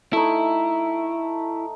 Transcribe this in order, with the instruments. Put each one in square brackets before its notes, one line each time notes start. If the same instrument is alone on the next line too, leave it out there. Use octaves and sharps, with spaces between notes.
[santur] A3 D#4 [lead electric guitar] E4